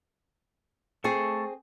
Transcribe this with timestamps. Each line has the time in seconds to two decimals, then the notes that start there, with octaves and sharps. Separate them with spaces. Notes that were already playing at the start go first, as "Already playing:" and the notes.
1.04 A3 C4 G#4 A5 C#6